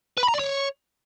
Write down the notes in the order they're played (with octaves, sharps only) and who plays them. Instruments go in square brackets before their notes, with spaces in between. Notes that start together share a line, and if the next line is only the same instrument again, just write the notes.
[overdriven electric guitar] B4
B5
A#5
D5
C#5